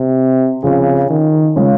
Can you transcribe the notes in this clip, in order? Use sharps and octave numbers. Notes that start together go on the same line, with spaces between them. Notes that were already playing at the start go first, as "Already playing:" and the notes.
Already playing: C3
C#3 F3 C4 F4 G#4
D#3
C#3 G#3 C#4 F4